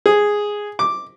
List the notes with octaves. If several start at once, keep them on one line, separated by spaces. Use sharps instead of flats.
G#4
D6